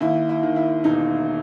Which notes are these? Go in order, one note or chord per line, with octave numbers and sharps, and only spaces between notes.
D#2 E4
E4
D#3
E4
E1 D#4